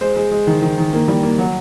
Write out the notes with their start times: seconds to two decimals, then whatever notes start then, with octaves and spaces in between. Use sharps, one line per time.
0.01 G#3 C5
0.16 G#3
0.31 G#3
0.47 D#3
0.62 D#3
0.78 D#3
0.93 A#3
1.08 G3
1.23 A#3
1.38 F#3